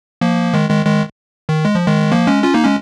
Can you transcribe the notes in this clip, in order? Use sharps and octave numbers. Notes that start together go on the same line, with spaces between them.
F3 A#3
D#3 G#3
D#3 G#3
D#3 G#3
D#3
G#3
F3
D#3 G#3
F3 A#3
G#3 C#4
C#4 F4
A#3 D#4
G#3 C#4